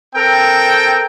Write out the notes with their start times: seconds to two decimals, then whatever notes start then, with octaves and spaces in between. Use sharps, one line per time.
0.15 C4 A4 A#4 G5